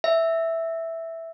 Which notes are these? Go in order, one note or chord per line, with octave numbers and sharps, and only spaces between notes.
E5